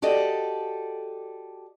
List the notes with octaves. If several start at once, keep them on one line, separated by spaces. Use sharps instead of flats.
F#4 G4 A4 D5 D#5